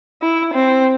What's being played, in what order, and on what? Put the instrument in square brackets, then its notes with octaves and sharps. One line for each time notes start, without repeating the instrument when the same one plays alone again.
[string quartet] E4
C4